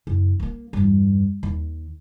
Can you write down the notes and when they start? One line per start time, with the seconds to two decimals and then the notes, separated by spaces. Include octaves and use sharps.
0.07 F#1
0.40 A3 A#3
0.73 E2 G2
1.43 D#2